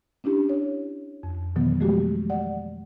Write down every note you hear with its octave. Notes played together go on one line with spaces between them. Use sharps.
C#4 D4 E4 G4
C#5
F2
B2 D#3 E3 F#3 B3
F3 G#3 A3 F#4 G4
D5 F#5